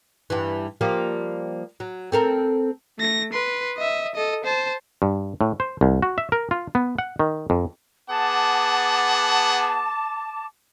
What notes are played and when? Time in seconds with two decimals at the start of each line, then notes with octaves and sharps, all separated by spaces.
0.30 G2 E3
0.81 F3 G3 A#3
1.80 F#3
2.12 C4 A4 A#4
2.98 A3 A#6
3.33 B4 C6
3.77 D#5 E5
4.15 A4 D#5
4.44 C5 A5
5.02 G2
5.41 A2
5.60 C5
5.81 C2
6.02 F#4
6.18 E5
6.32 A#4
6.51 F4
6.75 B3
6.98 F#5
7.19 D#3
7.50 F2
8.09 B3 G#4 F#5 A5 D6